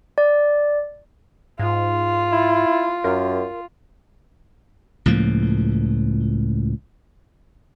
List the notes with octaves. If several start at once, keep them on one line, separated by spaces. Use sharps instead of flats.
D5
G#2 F4
E4
F#2 A#4
C#2 A2 F3 A#3